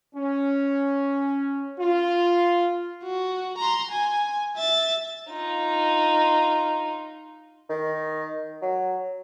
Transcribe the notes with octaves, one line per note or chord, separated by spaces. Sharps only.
C#4
F4
F#4
A#5 C6
G#5
E5 A6
D#4 F4
D#3
F#3